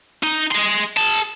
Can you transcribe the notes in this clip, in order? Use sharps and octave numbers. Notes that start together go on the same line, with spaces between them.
D#4
G#4 C6
G#4 A5